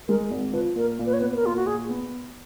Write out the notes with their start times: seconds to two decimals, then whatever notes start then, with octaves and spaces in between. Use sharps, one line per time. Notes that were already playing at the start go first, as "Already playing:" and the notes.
0.08 G#3 A#4
0.31 G#1
0.53 F3 B4
0.76 A#2 A#4
0.99 A#2
1.06 B4
1.13 C#5
1.20 B3 B4
1.32 B4
1.36 A#4
1.43 A#2 F4
1.56 F#4
1.66 A#2 G#4
1.89 B3